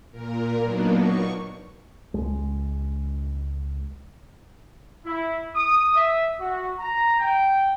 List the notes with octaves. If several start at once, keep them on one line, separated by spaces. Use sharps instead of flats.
A#2 A#4
F#3 A#3 B3 D4 D#4
C#6
C#2 G#3
E4
D#6
E5
F#4
A#5
G5